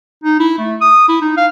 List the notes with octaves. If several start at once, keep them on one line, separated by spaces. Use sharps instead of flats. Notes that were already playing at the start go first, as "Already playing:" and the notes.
D#4
E4
A3
D#6
E4
D#4
F5